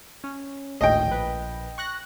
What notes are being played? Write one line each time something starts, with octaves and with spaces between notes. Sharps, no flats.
C#4
G#1 D2 A2 D#5 G5
A#1 B4
C#6 F#6 A#6